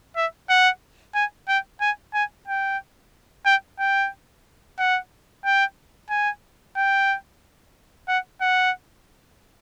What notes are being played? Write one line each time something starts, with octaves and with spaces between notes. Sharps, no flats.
E5
F#5
G#5
G5
G#5
G#5
G5
G5
G5
F#5
G5
G#5
G5
F#5
F#5